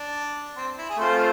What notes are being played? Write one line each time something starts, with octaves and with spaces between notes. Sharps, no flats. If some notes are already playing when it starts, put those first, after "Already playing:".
Already playing: D4
C4
E4
G#4
A3 C4 F4 C5